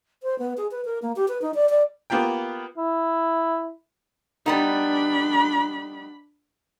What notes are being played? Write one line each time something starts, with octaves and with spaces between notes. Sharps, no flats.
C5
B3
G#4
B4
A#4
A#3
G4
B4
D#4
D5
D5
A#3 B3 F4 G4 G5
E4
G3 B3 D4 D#4 B5